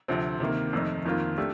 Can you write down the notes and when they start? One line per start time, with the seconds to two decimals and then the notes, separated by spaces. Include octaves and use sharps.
0.08 D2 C3 F3 C4
0.40 C3 D#3 A#3
0.73 F2 D#3 A3 D#4
1.05 F2 D#3 A#3 F4
1.38 A3 D4 G4